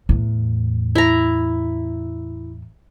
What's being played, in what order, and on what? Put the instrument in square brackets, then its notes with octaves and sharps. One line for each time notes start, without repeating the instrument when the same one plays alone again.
[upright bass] E2 A2
[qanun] E4 A#5